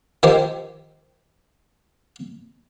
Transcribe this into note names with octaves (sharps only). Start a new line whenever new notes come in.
D#3 F3 G4 C5